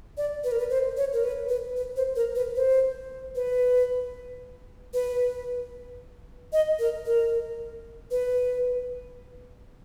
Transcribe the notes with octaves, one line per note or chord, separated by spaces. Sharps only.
D5
B4
A#4
B4
C5
C#5
A#4
B4
B4
B4
C5
A#4
B4
C5
B4
B4
D#5
A#4
A#4
B4